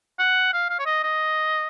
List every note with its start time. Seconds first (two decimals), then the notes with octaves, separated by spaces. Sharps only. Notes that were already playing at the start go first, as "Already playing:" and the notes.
0.19 F#5
0.53 F5
0.70 F5
0.79 C#5
0.86 D#5
1.03 D#5